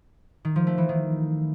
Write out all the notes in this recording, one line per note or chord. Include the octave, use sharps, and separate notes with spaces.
D#3
F3
A3
E3
D#3